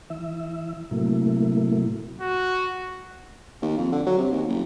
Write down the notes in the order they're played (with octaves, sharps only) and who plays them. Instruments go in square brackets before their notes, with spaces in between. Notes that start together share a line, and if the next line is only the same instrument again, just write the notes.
[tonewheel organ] E3 E5
A2 C3 F#3 A3 A#3 E4
[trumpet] F#4
[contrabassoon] D#2
F2
D3
F#3
C3
D#2
F#1